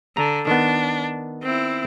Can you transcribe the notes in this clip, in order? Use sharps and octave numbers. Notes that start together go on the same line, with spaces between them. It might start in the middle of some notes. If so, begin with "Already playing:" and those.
D3 A#5
D#3 B3 D4
C4 E4